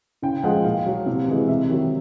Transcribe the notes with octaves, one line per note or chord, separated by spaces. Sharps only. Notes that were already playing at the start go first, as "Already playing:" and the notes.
C#3 G5
F3 G#3 F#5
A#2 F5
F#3
C3
E3 G#3
C3 E5
D#3 F#3